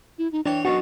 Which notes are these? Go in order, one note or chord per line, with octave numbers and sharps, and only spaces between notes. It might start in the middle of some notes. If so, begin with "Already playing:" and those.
E4
D#4
E3 D4 C#5 G5
B1 F#2 B2 F#4 C#6